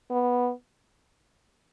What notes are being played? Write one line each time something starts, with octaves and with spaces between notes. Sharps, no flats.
B3